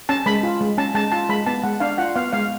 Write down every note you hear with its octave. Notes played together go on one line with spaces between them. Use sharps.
C#4 A5
G#3 B5
F4
G#3
C#4 A5
G#3 A5
F4 A5
G#3 B5
B3 A5
G#3 F#5
D4 F5
F4 F#5
B3 F5
G#3 F5